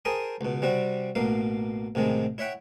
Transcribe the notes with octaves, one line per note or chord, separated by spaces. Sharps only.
G#4 A#4 C5 G5 A5 D#6
C#2 B2
C3 G3 C4 F#4
A1 B2 A#3 F5
A1 C3 D#3 G#3
E4 C#5 E5 F#5 G5